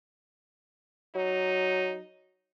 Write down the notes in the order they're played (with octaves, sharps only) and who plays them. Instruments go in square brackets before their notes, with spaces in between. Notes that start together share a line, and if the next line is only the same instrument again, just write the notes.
[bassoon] F#3 [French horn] D#4